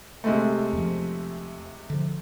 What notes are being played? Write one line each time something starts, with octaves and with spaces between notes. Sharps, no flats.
C3 G#3 A3
E2 F3
D3 F3